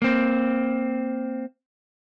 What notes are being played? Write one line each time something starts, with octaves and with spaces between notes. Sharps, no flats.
A#3 C4